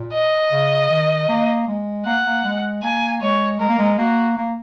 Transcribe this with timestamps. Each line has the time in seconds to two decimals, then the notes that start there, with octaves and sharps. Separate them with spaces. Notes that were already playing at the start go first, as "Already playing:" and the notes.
Already playing: A#2
0.13 D#5
0.52 C#3
0.90 D#3
1.28 A#3
1.68 G#3
2.06 A#3 F#5
2.26 A#3
2.44 G#3
2.83 A#3 G#5
3.21 G#3 C#5
3.59 G#3 A#4
3.69 A#3
3.79 G#3
3.98 A#3 F#4
4.37 A#3